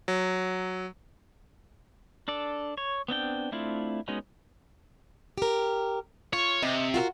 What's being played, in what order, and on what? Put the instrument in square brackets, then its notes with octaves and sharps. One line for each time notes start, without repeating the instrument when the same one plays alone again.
[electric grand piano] F#3
[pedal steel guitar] D4 A4 D5
C#5
B3 C4 D4 G5
A3 C4 D4 E4 F4
G#3 B3 C#4 D#4 F#4
[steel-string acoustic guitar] G4 A#4
[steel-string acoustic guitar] F4 [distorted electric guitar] C#5
[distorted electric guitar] C3 [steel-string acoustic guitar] D#5
[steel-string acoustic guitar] F4 F#4 A#4